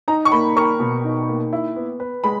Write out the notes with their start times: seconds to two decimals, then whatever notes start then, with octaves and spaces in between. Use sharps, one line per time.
0.08 D#4 A#5
0.25 C#6
0.32 A#3 B5
0.56 A#4 C#6
0.80 B2
1.04 D#4
1.29 A#3
1.53 E4
1.76 B3
2.00 B4
2.24 G#3 B5